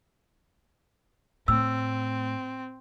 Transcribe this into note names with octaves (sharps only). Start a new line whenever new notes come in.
A2 C4 E6